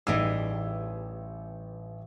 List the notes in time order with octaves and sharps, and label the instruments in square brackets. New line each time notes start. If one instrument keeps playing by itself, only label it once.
[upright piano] A1 D#4 E6 [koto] E3 G3 G#4